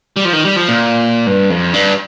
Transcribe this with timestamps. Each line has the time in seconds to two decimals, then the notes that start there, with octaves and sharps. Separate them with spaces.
0.16 G3
0.25 F3
0.33 D#3
0.45 G3
0.56 F3
0.68 A#2
1.27 G2
1.50 F2
1.74 G2